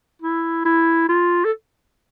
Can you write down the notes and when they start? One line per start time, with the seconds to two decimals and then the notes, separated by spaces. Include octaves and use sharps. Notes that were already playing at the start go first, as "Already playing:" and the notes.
0.22 E4
0.65 E4
1.09 F4
1.44 A4